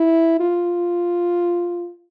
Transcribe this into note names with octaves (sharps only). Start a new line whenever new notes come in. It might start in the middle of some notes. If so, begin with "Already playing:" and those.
Already playing: E4
F4